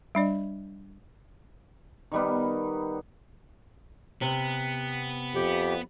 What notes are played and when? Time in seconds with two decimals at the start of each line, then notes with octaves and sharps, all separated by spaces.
0.15 G3 D4 D5 D#5
2.12 D#3 G3 B3
4.21 C3 B3
5.34 F2 G4